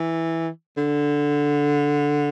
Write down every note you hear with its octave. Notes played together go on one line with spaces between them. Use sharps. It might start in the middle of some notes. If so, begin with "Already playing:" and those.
Already playing: E3
D3